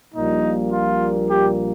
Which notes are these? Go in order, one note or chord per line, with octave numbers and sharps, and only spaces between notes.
A#1 A#2 G3 A#3 D#4
F4
G4